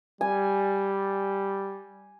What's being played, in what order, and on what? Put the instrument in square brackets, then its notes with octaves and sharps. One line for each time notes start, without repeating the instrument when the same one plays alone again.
[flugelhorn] G3 [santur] G#5